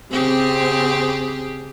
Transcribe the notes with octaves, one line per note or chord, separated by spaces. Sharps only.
C#3 C4 G4 G#4